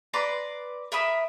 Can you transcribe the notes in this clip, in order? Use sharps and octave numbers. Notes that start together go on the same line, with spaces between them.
B4 D5 A#5 C6
A#4 E5 B5 D#6